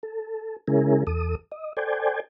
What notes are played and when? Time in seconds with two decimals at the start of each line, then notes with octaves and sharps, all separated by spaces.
0.03 A4
0.68 C#3 G#3 C#4 E4 G#4 A#4
1.07 E2 A4 D#6
1.52 D#5
1.77 A4 C5 D5 G5 G#5